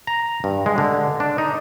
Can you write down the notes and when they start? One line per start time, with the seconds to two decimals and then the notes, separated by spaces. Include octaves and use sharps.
0.07 A#5
0.44 G2
0.66 G#3
0.78 D3
1.20 D4
1.38 D#4